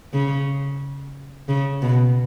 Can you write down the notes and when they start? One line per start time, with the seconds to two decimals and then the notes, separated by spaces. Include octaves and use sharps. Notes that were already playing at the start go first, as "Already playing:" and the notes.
0.13 C#3
1.48 C#3
1.82 B2